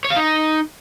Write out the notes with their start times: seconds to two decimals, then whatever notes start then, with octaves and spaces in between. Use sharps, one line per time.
0.04 C#5
0.10 F5
0.16 D#4